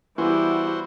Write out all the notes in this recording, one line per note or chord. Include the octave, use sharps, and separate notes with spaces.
E3 G3 B3 E4 F#4 C5